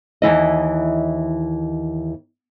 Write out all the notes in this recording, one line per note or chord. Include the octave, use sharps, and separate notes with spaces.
D#2 E3 E4 D#5